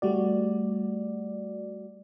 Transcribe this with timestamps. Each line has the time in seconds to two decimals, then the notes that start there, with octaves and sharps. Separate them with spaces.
0.02 G3 A3 F#4 D5